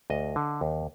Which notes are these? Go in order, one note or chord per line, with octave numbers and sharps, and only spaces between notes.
D2 D#5
D3
D#2